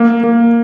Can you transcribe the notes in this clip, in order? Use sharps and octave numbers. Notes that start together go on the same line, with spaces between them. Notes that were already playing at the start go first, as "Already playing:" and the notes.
Already playing: A#3
A#3